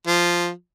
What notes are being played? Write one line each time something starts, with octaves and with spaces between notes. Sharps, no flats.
F3